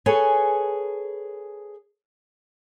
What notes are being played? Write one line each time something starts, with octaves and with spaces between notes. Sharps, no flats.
G#4 A4 B4 C#5 G#5